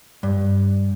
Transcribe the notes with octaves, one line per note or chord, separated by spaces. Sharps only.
G2